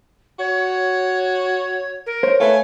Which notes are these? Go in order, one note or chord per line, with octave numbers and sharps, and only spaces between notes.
F#4 C#5
A#4
C5 C#5
A3 B4 C#5 F5 G#5